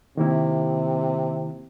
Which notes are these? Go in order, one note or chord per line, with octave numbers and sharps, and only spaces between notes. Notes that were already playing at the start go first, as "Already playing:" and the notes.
C3 D#3 A#3 E4